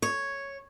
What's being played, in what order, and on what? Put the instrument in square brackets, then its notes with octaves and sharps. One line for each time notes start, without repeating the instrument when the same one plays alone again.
[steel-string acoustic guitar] C#5